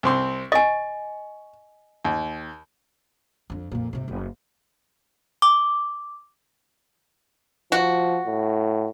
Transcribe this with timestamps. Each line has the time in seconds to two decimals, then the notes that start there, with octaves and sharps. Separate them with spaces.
0.03 C2 C4 C6
0.52 D#5 G#5 C#6
2.05 D#2
3.50 F2 D4
3.72 F2 A#2
3.93 G#1 C3
4.08 F#1
5.42 D6
7.72 F3 F#4
8.26 A2